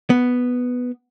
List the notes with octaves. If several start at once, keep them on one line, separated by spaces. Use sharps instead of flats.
B3